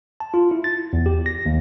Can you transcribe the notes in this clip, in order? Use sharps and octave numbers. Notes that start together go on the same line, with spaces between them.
A5
F4
E4
A6
E2
G4
A#6
D#2